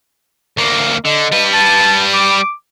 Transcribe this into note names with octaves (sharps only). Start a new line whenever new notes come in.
D2 A#3
D3 D#5
G3 B4
A5
D6